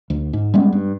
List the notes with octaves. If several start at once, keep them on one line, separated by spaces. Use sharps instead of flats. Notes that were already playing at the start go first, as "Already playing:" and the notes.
D2
G#2
G3 G#3 B3 C#4
G2